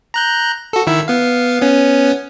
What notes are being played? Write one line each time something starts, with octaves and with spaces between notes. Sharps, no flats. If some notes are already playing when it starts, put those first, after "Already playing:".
A#5 F#6 G6
F#4 A4
D#3 E4 E6
B3 F5
B3 C#4